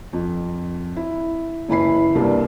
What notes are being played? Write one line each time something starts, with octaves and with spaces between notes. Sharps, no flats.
F2
E4
F#1 E3 E4 B5 C7
C2 G2 G3 A#3 C4